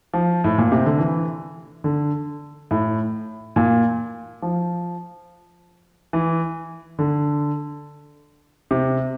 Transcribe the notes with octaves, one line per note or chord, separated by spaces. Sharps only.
F3
A2
A#2
C3
D3
E3
D3
A2
A#2
F3
E3
D3
C3